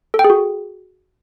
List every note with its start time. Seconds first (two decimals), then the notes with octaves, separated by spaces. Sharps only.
0.14 A4
0.19 G5
0.24 G#4
0.30 F#4